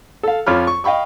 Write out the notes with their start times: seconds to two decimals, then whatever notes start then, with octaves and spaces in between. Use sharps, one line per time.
0.23 A4 F5
0.46 F2 F4 C#5 B5 D6 F6
0.67 C#6
0.84 D#5 F5 G5 B5 C#6